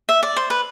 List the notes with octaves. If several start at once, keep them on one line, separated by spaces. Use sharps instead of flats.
E5
D5
C5
B4